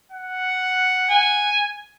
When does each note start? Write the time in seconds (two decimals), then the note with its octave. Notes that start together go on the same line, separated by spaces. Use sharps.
0.12 F#5
1.09 G#5